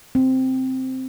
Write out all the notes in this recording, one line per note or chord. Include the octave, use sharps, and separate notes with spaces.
C4